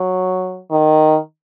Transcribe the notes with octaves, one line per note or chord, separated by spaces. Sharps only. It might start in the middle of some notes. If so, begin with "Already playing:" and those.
Already playing: F#3
D#3